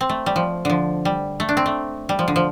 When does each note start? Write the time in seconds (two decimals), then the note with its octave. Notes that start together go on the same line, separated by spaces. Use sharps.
0.01 C4
0.09 A3
0.26 G3
0.36 F3
0.65 D3 F3
1.05 G3
1.40 A3
1.49 D4
1.57 C4
1.66 A3
2.09 G3
2.19 F3
2.28 D3
2.36 F3